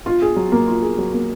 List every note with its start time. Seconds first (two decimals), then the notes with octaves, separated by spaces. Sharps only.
0.06 F4
0.22 G#4
0.36 F#3
0.52 A#3
0.68 F4
0.82 G#4
0.98 F#3
1.13 A#3